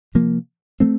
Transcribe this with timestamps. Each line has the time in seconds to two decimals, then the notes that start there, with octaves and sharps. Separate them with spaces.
0.15 C3 F3 A#3
0.80 F3 A3 C4